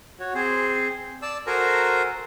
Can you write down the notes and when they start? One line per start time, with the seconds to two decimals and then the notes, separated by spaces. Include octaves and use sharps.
0.20 F#4 C#5
0.35 C4 G#4 C5
1.22 D5 A5 E6
1.47 F#4 A4 A#4 C5 G#5 A#5